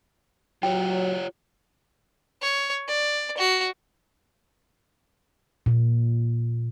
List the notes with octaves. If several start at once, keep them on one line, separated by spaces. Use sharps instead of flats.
F#3 F4 G4 C#5 G5
C#5
D5
F#4
A#2